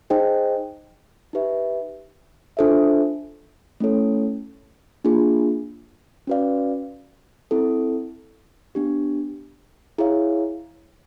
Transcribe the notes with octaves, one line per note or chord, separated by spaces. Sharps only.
D#4 G#4 C5 D#5 G5
D#4 G4 B4 E5
D4 F4 A4 C5 E5
A3 C#4 E4 A4 C#5
A#3 D4 F4 G#4
C#4 F#4 B4 D5 F5
C4 E4 A4
B3 D4 G4
E4 G#4 C#5 F5